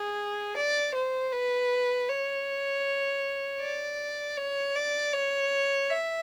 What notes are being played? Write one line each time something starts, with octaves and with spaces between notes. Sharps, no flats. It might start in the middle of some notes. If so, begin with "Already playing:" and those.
Already playing: G#4
D5
C5
B4
C#5
D5
C#5
D5
C#5
E5